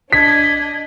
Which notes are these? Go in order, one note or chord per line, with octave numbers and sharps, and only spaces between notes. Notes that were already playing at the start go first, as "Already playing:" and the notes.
D4 D#5 G#6 B6